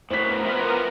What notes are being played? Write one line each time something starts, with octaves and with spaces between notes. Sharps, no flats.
A2 B3 E4 F#4 A#4 C5 B6
F4 B4 E5